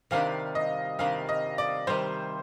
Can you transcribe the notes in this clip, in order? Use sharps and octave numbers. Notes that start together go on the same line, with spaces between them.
C3 D#3 G3 D4 F5
D#5
C3 D#3 G3 D4 F5
D#5
D5
C3 D#3 G3 C5